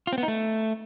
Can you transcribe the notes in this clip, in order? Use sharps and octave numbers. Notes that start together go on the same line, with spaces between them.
F4
C4
B3
D#4
A3